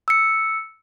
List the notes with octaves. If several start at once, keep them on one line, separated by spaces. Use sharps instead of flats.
E6 C#7